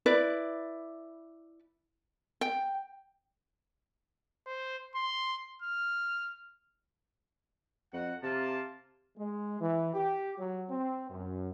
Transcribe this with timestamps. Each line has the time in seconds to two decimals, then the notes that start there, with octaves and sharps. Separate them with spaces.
0.06 E4 B4 D5
2.41 G5
4.47 C5
4.95 C6
5.62 F6
7.93 F2 F#4 F#5
8.23 C3 A#3 F4 A5
9.17 G#3
9.60 E3
9.94 G4
10.37 F#3
10.69 C4
11.09 F#2